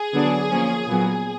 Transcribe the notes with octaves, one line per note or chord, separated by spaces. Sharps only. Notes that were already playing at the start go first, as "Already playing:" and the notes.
Already playing: G#4
D3 F#3 B3 D4
F3 A#3 C#4
A#2 F#3 B3